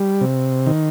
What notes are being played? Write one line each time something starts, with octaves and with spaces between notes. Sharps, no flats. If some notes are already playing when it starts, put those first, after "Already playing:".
Already playing: G3
C3
D#3